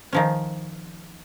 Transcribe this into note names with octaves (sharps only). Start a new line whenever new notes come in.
D#3 F3 C#4